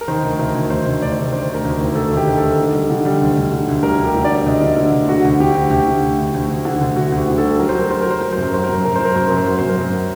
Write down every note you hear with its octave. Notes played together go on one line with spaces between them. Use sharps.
A#4
D#3 C5
D2
D2 A#4
D2
D#3 C5
D2
D2 D5
C3
D2 C5
D2
A#4
D2
D#3
D2 A4
D#3 G4
D2
A4
D#3
D3
G3
D3
G3
D2
D2
D3
D2
G3 A#4
D2
G4
D3
D5
G3
D2 D#5
D3
D3
D2
D3 F#4
D2
D3 G4
D2
D2 G4
D3
D2
D2
D2
D2
D3
D2
D2 F#4
D2 G4
D3
A4
G3
F#3 A#4
C5
F#3 A#4
F#3 C5
A#4
F#3 C5
F#3 A#4
F#2 C5
A#4
F#3 C5
F#2 A#4
C5
F#2 A#4
F#3 C5
A#4
F#2 C5
F#2 A#4
C5
F#3 A#4
F#2 C5
A#4
F#2